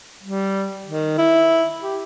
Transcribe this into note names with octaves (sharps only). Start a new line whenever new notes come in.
G3
D#3
E4
G4